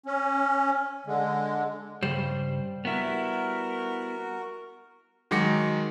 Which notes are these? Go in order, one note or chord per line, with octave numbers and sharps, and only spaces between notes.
C#4
D3 G#3
G2 C#3 G3 C5
B3 E4 F#4 A#4
D#3 F#3 G#3 D6 A#6 C#7